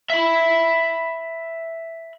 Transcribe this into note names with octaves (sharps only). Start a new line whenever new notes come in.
E5 B5